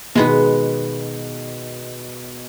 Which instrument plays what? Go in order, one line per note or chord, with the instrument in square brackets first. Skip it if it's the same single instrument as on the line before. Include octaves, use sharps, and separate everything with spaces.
[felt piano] B2 D#3 [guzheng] G#3 B3 B4